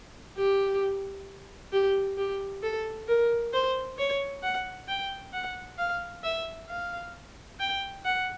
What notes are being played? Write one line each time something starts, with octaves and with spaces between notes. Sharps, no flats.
G4
G4
G4
A4
A#4
C5
C#5
F#5
G5
F#5
F5
E5
F5
G5
F#5